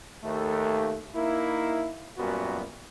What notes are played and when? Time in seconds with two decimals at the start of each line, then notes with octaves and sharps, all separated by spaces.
0.23 D#2 A3
1.15 A#3 D#4 E4
2.18 F#2 A#2 G3 B3 F#4